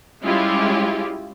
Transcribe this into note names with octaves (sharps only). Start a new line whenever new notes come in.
G3 G#3 C#4 E4 F4 G4